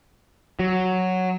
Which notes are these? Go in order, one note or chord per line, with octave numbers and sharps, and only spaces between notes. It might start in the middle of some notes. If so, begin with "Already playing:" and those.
F#3